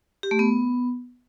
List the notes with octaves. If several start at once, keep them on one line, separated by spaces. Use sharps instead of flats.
G4
A3
B3